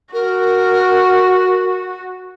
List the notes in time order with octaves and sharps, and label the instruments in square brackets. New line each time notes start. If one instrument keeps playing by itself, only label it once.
[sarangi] F#4 [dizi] A#4